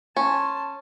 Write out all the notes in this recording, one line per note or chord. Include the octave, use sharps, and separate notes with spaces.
C#4 A5 C6